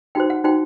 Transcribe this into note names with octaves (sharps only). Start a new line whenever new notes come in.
D#4 F#4 C5 G5
F#5
D#4 F#4 C5 G5